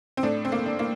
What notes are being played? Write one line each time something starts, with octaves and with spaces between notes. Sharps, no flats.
C4
A2 D4
C4
A#3
D4
A#3